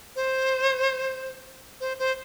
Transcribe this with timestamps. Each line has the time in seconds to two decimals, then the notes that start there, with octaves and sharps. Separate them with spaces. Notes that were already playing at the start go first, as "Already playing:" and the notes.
0.16 C5
1.80 C5
1.99 C5